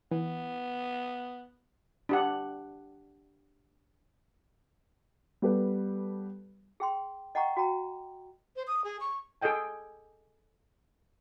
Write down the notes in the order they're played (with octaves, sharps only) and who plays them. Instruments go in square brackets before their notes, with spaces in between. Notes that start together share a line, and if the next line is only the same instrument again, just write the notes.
[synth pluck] E3 [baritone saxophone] B3
[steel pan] D4 G4 F#5
[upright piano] G3 B3 G4 A4 B4
[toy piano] G#4 G5 C6
D#5 F#5 G5 A#5 C#6
F#4 G5 A#5
[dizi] C5
D#6
G#4
C#6
[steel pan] G#4 A4 D#5 G5 G#5